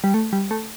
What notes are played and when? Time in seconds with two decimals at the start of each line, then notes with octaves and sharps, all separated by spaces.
0.04 G3
0.14 A3
0.33 G3
0.51 A3